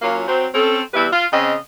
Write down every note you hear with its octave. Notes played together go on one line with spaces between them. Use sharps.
F#3 A#3 C#4 F4
F#3 C4
C4 C#4 A4
E2 G3 E4 B4 E5
F4
C#3 C4 D#5